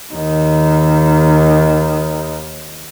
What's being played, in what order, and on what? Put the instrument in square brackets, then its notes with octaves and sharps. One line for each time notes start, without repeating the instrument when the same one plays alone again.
[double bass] D#2 D#3